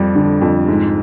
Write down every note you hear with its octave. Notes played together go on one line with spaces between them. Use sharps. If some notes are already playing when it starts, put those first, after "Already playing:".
Already playing: F2 G3
D3
F2
G#2